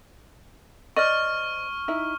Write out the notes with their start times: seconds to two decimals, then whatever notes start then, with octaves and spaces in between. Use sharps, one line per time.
0.96 C5 D5 D#5 C#6 F6
1.88 D#4 E4 E5